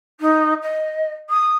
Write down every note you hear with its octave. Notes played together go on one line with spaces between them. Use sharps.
D#4
D#5
D#6